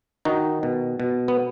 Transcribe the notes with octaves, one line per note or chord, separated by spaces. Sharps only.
D#3 D#4 F#4
B2
B2
B3